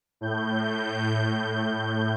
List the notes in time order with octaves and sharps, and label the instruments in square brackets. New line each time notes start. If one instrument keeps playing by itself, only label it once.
[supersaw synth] A2 G6